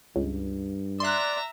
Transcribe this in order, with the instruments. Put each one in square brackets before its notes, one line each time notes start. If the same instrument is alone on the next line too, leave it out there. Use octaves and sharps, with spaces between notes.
[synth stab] C#2 [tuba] G2
[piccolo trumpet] D5 [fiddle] E5 A#5 [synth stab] C6 F#6